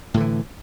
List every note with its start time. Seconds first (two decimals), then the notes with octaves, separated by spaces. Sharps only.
0.14 A2
0.17 D3
0.20 E3